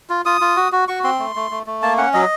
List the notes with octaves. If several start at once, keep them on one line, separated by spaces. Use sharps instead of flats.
F4
F4 D#6
F4
F#4
F#4
F#4 C#6
C4 C6
A3
A3
A3
A3
A#3 A5
C#4 F#5
F#3 D#5